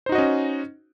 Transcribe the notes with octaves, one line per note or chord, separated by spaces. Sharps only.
C#4 D#4 F#4 C5 D#5